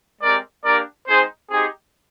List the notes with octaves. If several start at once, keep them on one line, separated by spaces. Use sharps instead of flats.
G#3 C4 G4 A#4 D5
A#3 D4 G4 A#4 D5
G#3 C4 D#4 G#4 C5
C4 D#4 G4 G#4